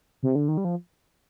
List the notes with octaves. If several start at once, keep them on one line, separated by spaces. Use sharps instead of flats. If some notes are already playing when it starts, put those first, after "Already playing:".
C3
D3
D#3
G3
F3